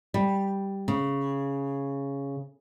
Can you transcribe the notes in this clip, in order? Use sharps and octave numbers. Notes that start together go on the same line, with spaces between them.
G3
C#3